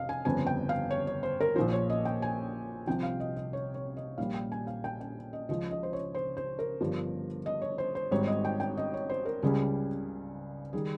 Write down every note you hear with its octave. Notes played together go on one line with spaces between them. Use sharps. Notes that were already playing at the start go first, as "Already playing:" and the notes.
Already playing: F1 D#5 F5
G#5
G1 F2 C#3 G#5
G5
F5
C#5
C#5
C5
A#4
A#1 A#2 F3 C5
C#5
D#5
G5
G#5
C2 C3 F3 G5
F5
D#5
D#5
C#5
C#5
D#5
A#1 A#2 G3 F5
G5
G#5
F5
G5
G5
D#5
C#2 C#3 F3 D#5
D#5
C5
C#5
C5
C5
A#4
G1 G2 F3
D#5
C#5
C5
C5
G#1 G#2 G3 C#5
D#5
G5
G5
D#5
C#5
C5
A#4
C#2 C#3 G3 G#4
D#3 G3 G#4